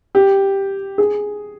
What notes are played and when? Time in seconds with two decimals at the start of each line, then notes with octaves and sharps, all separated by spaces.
0.15 G4
0.98 G#4